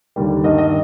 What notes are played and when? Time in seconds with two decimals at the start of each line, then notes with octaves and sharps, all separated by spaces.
0.16 D#2 D3 G3 A#3
0.44 G2 D#3 A#3 D#5
0.58 D#5